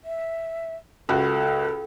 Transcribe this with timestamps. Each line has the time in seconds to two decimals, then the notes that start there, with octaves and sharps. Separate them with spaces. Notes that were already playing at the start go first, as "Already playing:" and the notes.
0.05 E5
1.09 C#2 F#4 A4